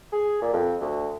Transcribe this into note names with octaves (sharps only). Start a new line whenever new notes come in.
G#4
A#2
F2
D2